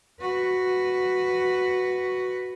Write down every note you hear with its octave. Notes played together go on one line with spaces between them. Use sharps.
F#4 B4